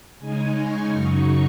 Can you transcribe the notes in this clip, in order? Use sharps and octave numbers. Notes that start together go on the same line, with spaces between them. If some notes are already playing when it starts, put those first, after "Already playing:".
C#3 G#3 D#4 G#5
C#6
F#2 C#3 F#3 D#4